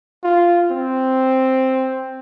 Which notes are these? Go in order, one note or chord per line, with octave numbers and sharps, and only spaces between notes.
F4
C4